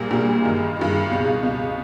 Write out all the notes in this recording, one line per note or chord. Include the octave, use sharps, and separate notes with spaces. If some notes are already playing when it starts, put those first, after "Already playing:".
Already playing: A#1 A#2 G3 A#3
A#1 A#2 G3 A#3
G2 D#3 G#3
G2 D#3 G#3
C#2 B2 G#3
C#2 B2 G#3